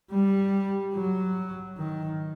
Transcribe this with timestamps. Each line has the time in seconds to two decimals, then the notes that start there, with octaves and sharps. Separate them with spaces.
0.11 G3
0.94 F#3
1.77 D#3